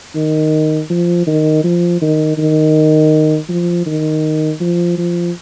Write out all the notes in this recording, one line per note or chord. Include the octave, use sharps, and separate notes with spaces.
D#3
F3
D#3
F3
D#3
D#3
F3
D#3
F3
F3